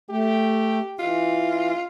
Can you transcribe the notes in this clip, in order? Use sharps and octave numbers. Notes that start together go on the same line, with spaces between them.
A3 G4
E3 F4